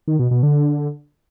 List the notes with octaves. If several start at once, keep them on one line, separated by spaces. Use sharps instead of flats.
D#3
B2
B2
D3